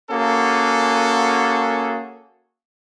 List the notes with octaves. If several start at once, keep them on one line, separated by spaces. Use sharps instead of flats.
A#3 C#4 F#4 G#4 A4